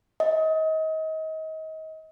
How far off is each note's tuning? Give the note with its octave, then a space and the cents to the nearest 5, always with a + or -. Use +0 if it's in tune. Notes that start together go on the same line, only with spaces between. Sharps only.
D#5 +30